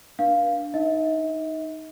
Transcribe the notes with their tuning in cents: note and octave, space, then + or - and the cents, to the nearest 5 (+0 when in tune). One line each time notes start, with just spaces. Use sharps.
D4 +0 A#4 +45 F5 +0
D#4 +0 D#5 +45